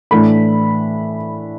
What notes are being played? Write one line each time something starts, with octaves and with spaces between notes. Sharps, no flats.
A2 E3 A3 D4 B5